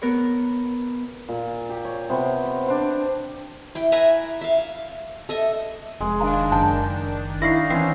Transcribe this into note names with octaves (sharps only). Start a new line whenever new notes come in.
B3 A#4 C#5
A#2
G4
C#5
C3 B3 C5 C#5
D4 C5 G5
E4 G5
B4 E5 G#5 A#5
E5 F5
A4 D#5 E5
F1 G#3
D#3 D4 F5 A#5
F#1 G5 A5
D#4 E4 F5 C#6 A#6 C7
E3 C4 C#4 C7